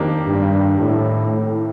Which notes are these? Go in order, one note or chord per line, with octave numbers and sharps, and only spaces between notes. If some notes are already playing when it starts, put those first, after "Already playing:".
Already playing: F2 D#3 A#3 D4 G4
G2
A2
A2